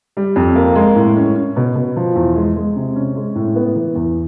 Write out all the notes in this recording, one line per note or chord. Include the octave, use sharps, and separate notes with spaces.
G3
F2
A#3
G#3
A2
C#4
C#4
B2
B2
F3
E2
G#3
G#3
C3
C#4
G#3
A2
B3
E3
E2